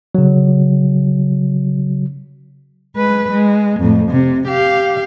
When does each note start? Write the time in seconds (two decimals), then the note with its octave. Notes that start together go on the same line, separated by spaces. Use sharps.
0.15 C#3 F#3
2.96 G#3 B4
3.32 G#3
3.80 F2 A2
4.10 C3
4.47 G4 F5